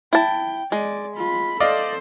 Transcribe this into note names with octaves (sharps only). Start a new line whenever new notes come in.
E4 G5 A5
G#3 D5
F4 B5
A4 C5 D5 D#5 F5